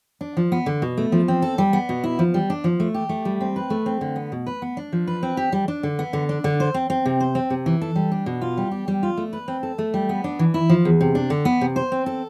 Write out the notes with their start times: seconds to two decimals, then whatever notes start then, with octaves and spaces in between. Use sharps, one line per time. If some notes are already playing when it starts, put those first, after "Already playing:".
0.21 D4
0.37 F3
0.52 B3
0.66 D3
0.82 B2
0.97 A3
1.12 F3
1.28 C4
1.42 A4
1.58 G3
1.73 B3
1.89 B2
2.04 E4
2.19 F3
2.34 G3
2.50 D4
2.64 F3
2.80 A3
2.94 G4
3.09 A3
3.25 G3
3.41 C4
3.56 B4
3.70 A3
3.86 C4
4.01 D3
4.16 B3
4.32 B2
4.46 B4
4.62 B3
4.77 D4
4.92 F3
5.07 B4
5.23 C4
5.37 G4
5.52 G3
5.68 D4
5.83 D3
5.99 B3
6.13 D3
6.29 D4
6.44 D3
6.60 C5
6.74 C4
6.90 C4
7.06 C3
7.20 C5
7.35 C4
7.50 C3
7.66 E3
7.82 A4
7.96 G3
8.11 D4
8.26 B2
8.41 F4
8.57 G3
8.71 G4
8.88 G3
9.03 F4
9.17 A3
9.33 B4
9.48 C4
9.63 A4
9.78 A3
9.94 G3
10.09 B3
10.24 D4
10.39 E3
10.54 E4
10.69 F3
10.85 E2
11.01 C3
11.15 D4
11.30 D3
11.45 B3
11.61 C3
11.76 C5
11.92 C4
12.06 A4